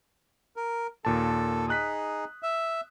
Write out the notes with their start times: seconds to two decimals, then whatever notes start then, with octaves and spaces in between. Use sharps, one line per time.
0.56 A#4
1.05 D#2 A#2 A4 A5
1.68 D#4 G#4 D#6 F#6 B6
2.43 E5